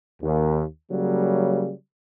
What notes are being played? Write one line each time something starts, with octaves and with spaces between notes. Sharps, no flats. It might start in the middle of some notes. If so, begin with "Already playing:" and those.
D#2
C#3 F#3 G3 A#3